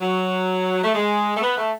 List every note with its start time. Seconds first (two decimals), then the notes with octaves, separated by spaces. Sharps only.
0.01 F#3
0.84 A3
0.95 G#3
1.37 A3
1.42 B3
1.58 A3